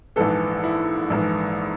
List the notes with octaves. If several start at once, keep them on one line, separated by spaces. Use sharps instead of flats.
A#1 G#2 E3 A4
E4
A#1 G#2 E3